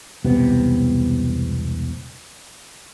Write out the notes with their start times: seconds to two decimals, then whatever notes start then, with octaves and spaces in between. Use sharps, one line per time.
0.24 E1 C2 C3 B3